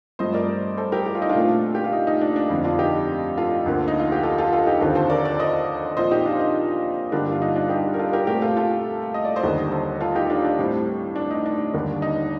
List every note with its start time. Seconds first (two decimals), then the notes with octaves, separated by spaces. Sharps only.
0.19 G2 F3 A3 C4 C5 D#5
0.34 A#4 D5
0.77 A4 C5
0.92 G4 A#4
1.06 G4
1.15 F4
1.22 D#4
1.29 D4 F4
1.35 A#2 A3 C4
1.75 G4
1.84 F4
1.93 D#4
2.07 D#4
2.21 D4
2.36 D4
2.50 F2 D3 F3 D#4
2.64 D4 F4
2.79 D#4 G4
3.37 F4 A4
3.66 D2 D3 F3 A#3
3.88 D#4
4.00 F4
4.12 G4
4.23 F4 A4
4.38 F4 A4
4.53 F4 A4
4.67 D#4 G4
4.81 D#2 D3 F3 C4 F4 A4
4.95 A4 C5
5.10 A#4 D5
5.25 A#4 D5
5.39 C5 D#5
5.97 A#2 F3 C4 C5 D#5
6.11 D#4 G4
6.26 D4 F4
6.40 D#4
7.12 G2 D3 G3 A#3 D4
7.32 F4
7.42 D#4
7.55 D4 F4
7.70 D#4 G4
7.94 A#4
7.99 F4 A4
8.13 G4 A#4
8.27 A#2 A3 C4 G4 A#4
8.42 F4 A4
8.57 F4 A4
9.14 D#5
9.25 D5
9.36 C5 D#5
9.43 D#2 D3 G3 A#3
9.71 A4 C5
10.01 F4 A4
10.15 D#4 G4
10.30 D4 F4
10.45 D4
10.59 A2 G3 C4
11.16 D4
11.31 D#4
11.46 D4
11.74 D#2 D3 G3 A#3
12.02 D#4